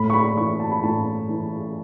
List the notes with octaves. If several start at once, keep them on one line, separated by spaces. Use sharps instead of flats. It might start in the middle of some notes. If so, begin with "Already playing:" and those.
Already playing: A2 B5
C#6
B5
E3 C#6
A5
B5
A2 A5
E3